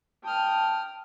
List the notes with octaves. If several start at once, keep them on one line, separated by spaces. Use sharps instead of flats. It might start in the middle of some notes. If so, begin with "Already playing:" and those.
G5 A5 D#6 F6